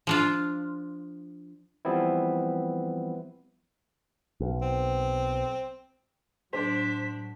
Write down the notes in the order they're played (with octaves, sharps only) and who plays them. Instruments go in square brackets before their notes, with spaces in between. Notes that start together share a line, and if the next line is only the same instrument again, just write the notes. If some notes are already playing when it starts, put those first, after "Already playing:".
[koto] F3 D4 F4
[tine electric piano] E3 F3 G3 B3 C4 E4
[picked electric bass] B1
[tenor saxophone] C4
[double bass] A2 F#3 [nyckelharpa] D4 [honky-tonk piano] C5 [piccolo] B6